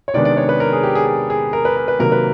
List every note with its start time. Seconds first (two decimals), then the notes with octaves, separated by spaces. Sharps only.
0.08 C#5
0.14 C3 D#3 G#3 B3 D4 D5
0.25 D5
0.37 C#5
0.49 B4
0.60 A#4
0.72 G#4
0.83 G4
0.95 G#4
1.07 G#4
1.30 G#4
1.53 A#4
1.65 B4
1.77 A#4
1.88 B4
1.99 C3 D#3 F#3 A#3 A#4
2.12 B4